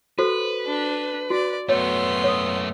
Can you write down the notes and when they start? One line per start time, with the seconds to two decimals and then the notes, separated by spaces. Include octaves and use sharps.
0.19 F#4 A4 B4 C5
0.66 D4
1.30 F#4 D5
1.69 F#2 A3 B3 C#5 C6
2.24 C#5 D#6